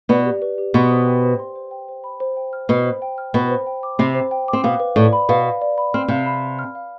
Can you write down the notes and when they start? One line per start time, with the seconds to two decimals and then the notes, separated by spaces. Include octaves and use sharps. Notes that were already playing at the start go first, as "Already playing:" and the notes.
0.09 B2 B3 D5
0.25 G4
0.42 B4
0.58 G4
0.74 B2 B3 C6
0.91 C5
1.07 G5
1.23 C5
1.39 C6
1.56 C5
1.71 G5
1.89 C5
2.04 B5
2.20 C5
2.37 G5
2.53 F6
2.69 B2 B3 B5
2.85 C5
3.02 G5
3.18 F6
3.34 B2 B3 B5
3.50 C5
3.67 G5
3.83 D6
3.99 C3 C4 B5
4.15 C5
4.31 G5
4.48 C4 D6
4.64 B2 B3 F5
4.80 B4
4.96 A2 A3 D5
5.13 B5
5.29 B2 B3 F5
5.45 B4
5.62 D5
5.78 B5
5.94 C4 F6
6.08 C3 C4 F5
6.26 B5
6.43 F5
6.59 F6
6.75 F5